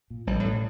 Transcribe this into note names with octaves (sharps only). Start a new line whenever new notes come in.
A#2
A1 G3
A2